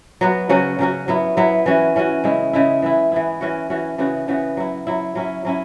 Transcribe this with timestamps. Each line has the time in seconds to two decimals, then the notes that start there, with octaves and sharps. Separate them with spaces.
0.21 F#3 B3 F#4
0.49 C#3 F#3 C#4 F#4
0.79 C#3 F#3 C#4 F#4
1.08 F#3 B3 E4
1.37 F#3 B3 E4
1.66 E3 C#4 F#4
1.96 E3 C#4 F#4
2.24 C#3 G#3 E4
2.53 C#3 G#3 E4
2.82 E3 B3 E4
3.12 E3 B3 E4
3.41 E3 C#4 F#4
3.70 E3 C#4 F#4
3.98 C#3 E3 B3 F#4
4.28 C#3 E3 B3 F#4
4.57 F#3 E4
4.87 F#3 E4
5.15 F#3 C#4 E4
5.45 F#3 C#4 E4